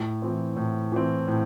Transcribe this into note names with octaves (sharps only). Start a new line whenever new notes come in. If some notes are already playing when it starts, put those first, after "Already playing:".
Already playing: A2
E3 C4
A2
E3 C4
A2